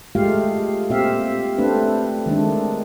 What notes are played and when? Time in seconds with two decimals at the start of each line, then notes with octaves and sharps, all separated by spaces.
0.15 G#3 A3 F4 G4 F5
0.90 A#2 C4 G4 E5 F5
1.58 A3 C4 D4 B4
2.26 D#3 G#3 A3 D4